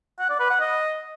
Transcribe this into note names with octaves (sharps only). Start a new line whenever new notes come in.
F#5
D5
B4
F#5
D#5